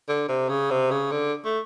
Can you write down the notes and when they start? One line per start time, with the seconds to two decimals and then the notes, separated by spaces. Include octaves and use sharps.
0.08 D3
0.28 C3
0.49 C#3
0.71 C3
0.91 C#3
1.12 D3
1.45 A3